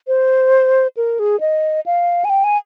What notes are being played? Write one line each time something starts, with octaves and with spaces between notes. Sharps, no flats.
C5
A#4
G#4
D#5
F5
G#5
G5
G#5